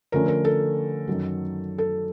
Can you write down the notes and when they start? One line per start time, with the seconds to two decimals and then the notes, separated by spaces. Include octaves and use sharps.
0.12 D3 F3 A3 C#4 A#4
0.28 A#4
0.45 A4
1.07 F#2 D#3 F#3
1.78 A4